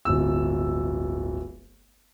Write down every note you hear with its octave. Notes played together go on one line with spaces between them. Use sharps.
D1 G1 E6